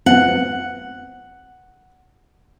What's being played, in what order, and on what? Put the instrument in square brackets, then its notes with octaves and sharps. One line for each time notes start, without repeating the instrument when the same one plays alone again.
[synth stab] B3 C4 [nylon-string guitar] F#5